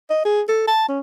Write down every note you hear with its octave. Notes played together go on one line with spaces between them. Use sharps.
D#5
G#4
A4
A5
C#4